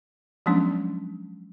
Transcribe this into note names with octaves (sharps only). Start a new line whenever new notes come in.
F3 F#3 G#3 B3 C#4 D4